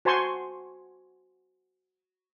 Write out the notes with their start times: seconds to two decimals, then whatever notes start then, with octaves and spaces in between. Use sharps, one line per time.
0.05 F#4 C5 G#5 A5 C6 C#6